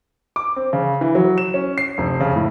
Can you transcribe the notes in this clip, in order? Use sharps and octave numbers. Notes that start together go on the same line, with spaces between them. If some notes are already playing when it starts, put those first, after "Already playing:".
D6
C4
C#3
E3
F#3
E7
C#4
C7
F1
C#3
A2